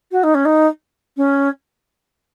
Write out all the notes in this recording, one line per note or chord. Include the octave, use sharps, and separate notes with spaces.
F#4
D#4
C#4
D#4
C#4